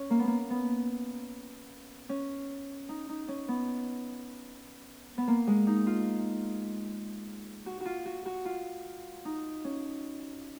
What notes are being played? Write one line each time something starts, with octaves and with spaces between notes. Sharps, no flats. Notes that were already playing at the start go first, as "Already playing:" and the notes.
Already playing: C#4
A#3
B3
A#3
B3
C#4
D#4
D#4
C#4
B3
B3
A#3
G#3
D#4
F4
F#4
F4 F#4
F#4
F#4
F4
D#4
C#4